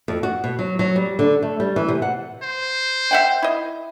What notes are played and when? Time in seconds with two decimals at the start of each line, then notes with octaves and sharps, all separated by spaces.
0.08 F2
0.23 F#4
0.44 B2
0.59 F#3
0.79 F#3
0.96 G3
1.19 D3
1.43 A3
1.60 G3
1.76 E3
1.88 C3
2.02 F#5
2.43 C5
3.11 E5 F#5 G5
3.42 E4 D#5